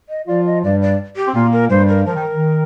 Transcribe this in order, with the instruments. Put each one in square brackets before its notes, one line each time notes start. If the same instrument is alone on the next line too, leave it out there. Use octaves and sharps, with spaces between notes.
[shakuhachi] D#5
[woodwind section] F3 F4 [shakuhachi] D5
[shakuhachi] D#5
[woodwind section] G2 G3 [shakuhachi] D5
[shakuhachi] D5
G4
[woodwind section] C4
[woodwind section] A#2 A#3 [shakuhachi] F4
[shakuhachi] A#4
[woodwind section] G2 G3 [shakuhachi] C5
[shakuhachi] A#4
[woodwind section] F3 [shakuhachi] A#4
[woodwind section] D#3
D#3